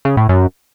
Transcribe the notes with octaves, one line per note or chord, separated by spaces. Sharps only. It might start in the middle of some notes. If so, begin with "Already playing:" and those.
C#3
A2
F#2